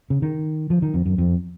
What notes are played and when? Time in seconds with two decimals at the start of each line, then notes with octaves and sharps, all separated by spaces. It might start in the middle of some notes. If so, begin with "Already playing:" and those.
0.10 C#3
0.22 D#3
0.70 F3
0.82 D#3
0.94 F2
1.06 F#2
1.18 F2